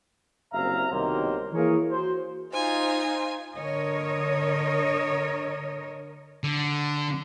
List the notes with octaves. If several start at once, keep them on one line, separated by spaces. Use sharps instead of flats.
F#1 C2 C4 E5 F5 A#5
C2 B2 D#3 F#3 A#3 C5
E3 A#3 E4 G#4 A#4 C#5
F#4 C5
D#4 F4 C5 G#5
D3 A#4 C#5 D#5
D3